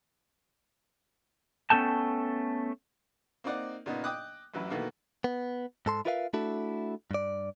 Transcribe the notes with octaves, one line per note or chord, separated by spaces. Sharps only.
A3 B3 C#4 A4 G5 A5
A#3 C4 D#4 D5 F#5
A#2 C#3 B3 D#4
D#5 G5 D6 D#6 F#6
A1 F#2 E3 E4 B4
B2 D#3 E3 A3 A#3
B3
G#2 A4 C6
E4 F4 A#4 B4 E5 F5
A3 D4 E4 F#4 A4
G2 D5